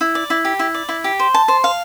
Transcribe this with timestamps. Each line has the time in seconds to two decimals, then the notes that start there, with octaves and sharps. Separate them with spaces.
0.01 E4
0.15 D5
0.30 E4
0.45 G4
0.59 E4
0.74 D5
0.89 E4
1.04 G4
1.20 C5
1.34 A5
1.48 C5
1.64 F5